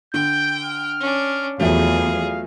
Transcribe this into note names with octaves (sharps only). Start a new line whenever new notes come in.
D3 G5 G6
F6
C#4 D4
E2 F3 F#3 A3 G#4 F5